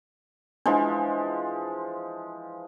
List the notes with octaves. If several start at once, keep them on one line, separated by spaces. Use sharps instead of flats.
E3 F3 G#3 D4